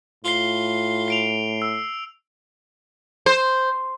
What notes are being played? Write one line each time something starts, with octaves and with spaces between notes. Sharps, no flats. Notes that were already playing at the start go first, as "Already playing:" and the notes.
A2 F4 C7 G7
C7 D7 F7
E6
C5